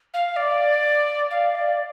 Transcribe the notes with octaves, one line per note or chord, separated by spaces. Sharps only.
F5
D5
F5
D5